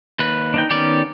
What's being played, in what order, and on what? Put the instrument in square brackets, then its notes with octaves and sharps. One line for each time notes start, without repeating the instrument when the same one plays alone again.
[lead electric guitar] D#2 B4
[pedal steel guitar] D4 D#4 G5
[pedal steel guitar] D#3 B3 C#4 [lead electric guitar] G4 D5